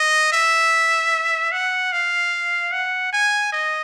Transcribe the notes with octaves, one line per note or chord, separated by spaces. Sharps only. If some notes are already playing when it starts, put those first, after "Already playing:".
Already playing: D#5
E5
F#5
F5
F#5
G#5
D#5